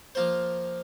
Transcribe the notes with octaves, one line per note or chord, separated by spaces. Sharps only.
F3 A#3 F4 C5